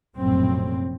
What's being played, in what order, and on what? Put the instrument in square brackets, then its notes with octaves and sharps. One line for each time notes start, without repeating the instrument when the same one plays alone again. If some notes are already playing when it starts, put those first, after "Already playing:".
[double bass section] F1 A#1 F#2 A2 F#3 C4